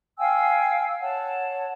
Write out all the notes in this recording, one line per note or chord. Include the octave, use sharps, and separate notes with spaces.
F5 G5 G#5 E6
C#5 F#5 A5